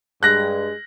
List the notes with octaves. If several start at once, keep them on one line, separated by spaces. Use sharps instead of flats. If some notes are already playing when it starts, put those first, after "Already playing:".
G2 G#3 F#6 A#6